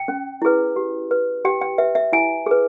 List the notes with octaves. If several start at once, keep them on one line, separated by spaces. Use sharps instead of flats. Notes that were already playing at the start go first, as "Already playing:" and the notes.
Already playing: G5
C#4
E4 G#4 B4
G4
B4
G4 G5
G5
B4 E5
E5
E4 G#5
G#4 B4